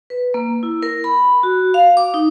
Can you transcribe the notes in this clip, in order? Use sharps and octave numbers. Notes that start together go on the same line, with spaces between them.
B4
A#3
E4
A#4
B5
F#4
F5
D6
D#4